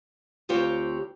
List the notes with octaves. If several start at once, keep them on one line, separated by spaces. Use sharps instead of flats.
D2 C4 F4 G4 C#5 D5